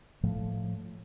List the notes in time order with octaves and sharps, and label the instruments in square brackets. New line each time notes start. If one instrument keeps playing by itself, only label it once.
[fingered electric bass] A2 F3 A3